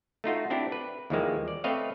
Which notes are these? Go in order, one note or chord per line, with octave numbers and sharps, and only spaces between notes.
A3 D#4 F4 F#4
C4 D4 E4 G4
B4
D#2 E3 F3 G3 G#3 A#3
D5
A3 C4 B4 C#5 D#5 F5